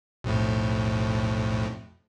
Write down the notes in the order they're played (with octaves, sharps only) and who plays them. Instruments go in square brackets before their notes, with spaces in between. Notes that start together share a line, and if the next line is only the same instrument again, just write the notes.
[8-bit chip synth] B1 F2 A2